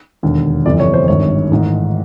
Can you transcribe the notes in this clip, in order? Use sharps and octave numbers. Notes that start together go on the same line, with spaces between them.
E1 D#2 D3
G1 F2 C3 E3 D5
C#5
C5
G#1 G2 D#3 C#5
A1 G#2 D#3